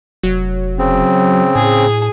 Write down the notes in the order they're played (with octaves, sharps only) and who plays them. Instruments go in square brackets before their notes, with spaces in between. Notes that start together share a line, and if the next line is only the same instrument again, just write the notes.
[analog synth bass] F1 [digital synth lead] F#3
[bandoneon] C#3 C4
[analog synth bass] A2 [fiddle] G#4